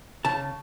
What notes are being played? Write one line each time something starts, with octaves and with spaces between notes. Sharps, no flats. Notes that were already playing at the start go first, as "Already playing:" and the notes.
C#3 A5